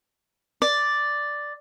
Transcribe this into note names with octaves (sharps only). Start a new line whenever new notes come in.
D5